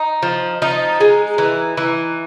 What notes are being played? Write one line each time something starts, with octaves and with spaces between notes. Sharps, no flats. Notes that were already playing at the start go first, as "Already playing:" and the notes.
Already playing: D#4
F3
F3 D#4
G#3
E3
E3